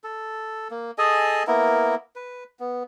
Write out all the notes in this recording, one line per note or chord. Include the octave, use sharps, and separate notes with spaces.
A4
A#3
G#4 A4 D#5 G#5
A#3 B3 E4 A#4
B4
B3